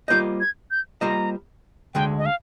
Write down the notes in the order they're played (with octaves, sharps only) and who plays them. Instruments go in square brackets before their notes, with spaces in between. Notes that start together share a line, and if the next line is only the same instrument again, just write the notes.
[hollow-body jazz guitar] G3 A#3 F4 C5 D#5 [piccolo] G6
[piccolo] G#6
G6
[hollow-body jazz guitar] G3 A#3 F4 C5 D#5 [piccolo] A#5
[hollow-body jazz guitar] D2 D3 G#3 [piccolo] G5
[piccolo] D#5
F5